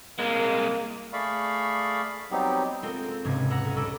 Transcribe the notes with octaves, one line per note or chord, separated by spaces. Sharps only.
C2 G#3 A#3
A3 G#4 D5 F5 B5 C#6
F#3 G3 B3 C4 D#4 G4
G#3 C4 F4 A4 A#4 G5
C4
E1 C#2 G#2 C3 C#4 G#6
E5 F#5 A#5 F#6 A#6
B1 G#5 E6
G3 C#4 A4 E5 D6 A#6